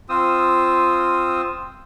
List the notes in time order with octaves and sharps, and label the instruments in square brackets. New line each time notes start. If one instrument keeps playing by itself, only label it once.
[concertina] C4 D#6 E6 [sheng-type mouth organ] F4